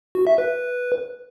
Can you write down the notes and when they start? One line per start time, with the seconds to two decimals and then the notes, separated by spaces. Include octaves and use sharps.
0.15 F#4
0.27 E5
0.38 B4